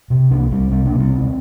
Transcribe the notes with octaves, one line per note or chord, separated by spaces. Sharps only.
C3
C2 A#3 D4
C2 G3 C4
C3 G3 C4
A#3 D4
C3
G3 C4
D2